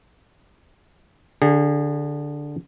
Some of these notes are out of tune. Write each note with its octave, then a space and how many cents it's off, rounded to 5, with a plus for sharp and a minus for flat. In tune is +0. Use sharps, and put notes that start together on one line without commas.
D3 +0 G#4 -30